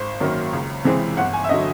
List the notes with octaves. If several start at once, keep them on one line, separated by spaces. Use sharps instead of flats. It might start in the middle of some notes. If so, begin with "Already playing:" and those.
Already playing: G#1 C5
F#2 D#3 F#3 A#3
C#2
C3 E3 G#3 C4
G1 F#5
G#5
E5
D3 F#3 D#5